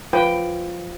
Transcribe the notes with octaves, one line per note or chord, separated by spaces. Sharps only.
F3 B4 G5